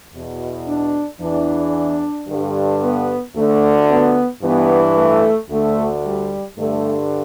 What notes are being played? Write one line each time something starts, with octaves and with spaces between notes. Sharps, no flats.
E2 B2
D4
E2 E3 D4
G2 D3
B3
D2 D3 A3
B3
G2 E3 B3
A3
D2 D3 A3
G3
G2 D3 A3